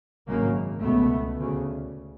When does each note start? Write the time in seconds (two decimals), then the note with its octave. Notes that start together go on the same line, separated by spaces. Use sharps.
0.27 G#1 F#2 C#3 G#3 A#3
0.82 C#2 B2 A3 B3
1.37 D2 C#3